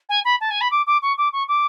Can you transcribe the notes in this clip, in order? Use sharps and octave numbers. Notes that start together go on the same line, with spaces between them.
G#5
B5
A5
G#5
B5
D6
D6
C#6
D6
C#6
D6